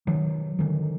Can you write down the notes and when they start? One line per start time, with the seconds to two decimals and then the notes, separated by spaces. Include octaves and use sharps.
0.07 D#3 F#3
0.59 D3 D#3 F#3